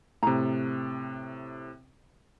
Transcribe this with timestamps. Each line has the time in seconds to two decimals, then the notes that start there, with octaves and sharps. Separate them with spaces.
0.23 A2 C3 A#5